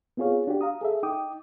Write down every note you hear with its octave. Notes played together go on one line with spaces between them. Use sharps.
B3 C4 F4 G#4 C#5 F5
D4 F#4 G4
F5 A#5 D#6
G#4 A4 E5
D#4 G5 D6 D#6